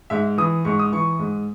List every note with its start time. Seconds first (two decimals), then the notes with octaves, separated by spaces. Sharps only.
0.10 G#2 E5
0.38 E3 D#6
0.65 G#2 C#6
0.79 D#6
0.92 E3 C#6
1.19 G#2